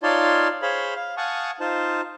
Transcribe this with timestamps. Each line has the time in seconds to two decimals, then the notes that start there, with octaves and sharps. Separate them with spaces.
0.03 D#4 F4 C#5 D5 A5 C6
0.62 G#4 C5 C#5 F5 B5 C6
0.95 F5
1.17 F5 F#5 G#5 A5 C#6 D#6
1.60 D#4 F4 C5 A5